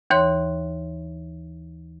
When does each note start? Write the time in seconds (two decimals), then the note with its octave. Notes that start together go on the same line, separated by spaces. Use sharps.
0.10 D#2 E3 C#5 C6